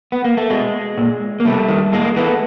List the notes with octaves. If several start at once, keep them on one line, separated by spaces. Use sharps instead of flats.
B3
A#3
A3
B2 G#3
A#2
A#3
C3 G3 A3
D#3
A2 G#3 A#3
E3 A3 B3